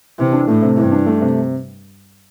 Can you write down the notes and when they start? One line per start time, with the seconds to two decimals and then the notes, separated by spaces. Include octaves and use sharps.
0.18 C3 E3
0.33 D4
0.48 A2 A3
0.62 C3
0.77 G2 E3
0.92 D4
1.06 A3
1.21 C3